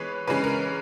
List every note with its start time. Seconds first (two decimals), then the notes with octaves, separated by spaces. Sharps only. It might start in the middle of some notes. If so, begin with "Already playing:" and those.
Already playing: E3 G#3 B3 B4 C#5
0.28 C#3 E3 G#3 C#4 B4
0.44 A#4